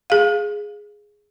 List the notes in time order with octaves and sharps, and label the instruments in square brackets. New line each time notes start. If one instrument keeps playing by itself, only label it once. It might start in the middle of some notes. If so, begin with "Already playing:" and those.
[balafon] G#4 F5